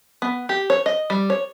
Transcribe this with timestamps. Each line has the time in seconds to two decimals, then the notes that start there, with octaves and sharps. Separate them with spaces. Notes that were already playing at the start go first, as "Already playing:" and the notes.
0.22 B3
0.49 G4
0.70 C#5
0.86 D#5
1.10 G3
1.30 C#5